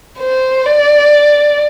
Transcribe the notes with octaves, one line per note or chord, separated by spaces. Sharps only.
C5
D5